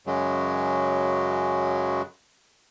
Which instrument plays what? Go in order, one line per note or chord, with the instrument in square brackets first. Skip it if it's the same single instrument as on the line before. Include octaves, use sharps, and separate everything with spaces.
[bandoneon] F#2 C#3 F#3 G#3